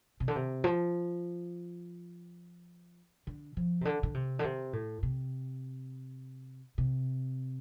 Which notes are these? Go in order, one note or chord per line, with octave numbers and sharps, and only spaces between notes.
C3
D3
C3
F3
D3
F3
C3
D3
D3
C3
D3
C3
A2
C3
C3